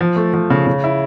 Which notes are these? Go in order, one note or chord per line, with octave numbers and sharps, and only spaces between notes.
F3
A3
F3
C#3
C#3
E4